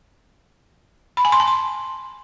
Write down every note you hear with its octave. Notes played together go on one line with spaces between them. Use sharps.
B5
G#5
C6
A5
C6